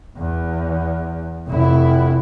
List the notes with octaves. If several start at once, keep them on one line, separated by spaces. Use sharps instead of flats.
E2
F1 E4